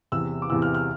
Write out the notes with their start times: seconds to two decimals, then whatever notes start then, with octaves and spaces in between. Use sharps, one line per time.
0.12 E2 C3 E3 E6
0.42 D6
0.50 E2 C3 E3 E6
0.62 F6
0.75 F6